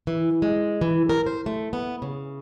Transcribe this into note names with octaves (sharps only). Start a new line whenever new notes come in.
E3
G#3
E3
A#4
C5
A3
B3
C#3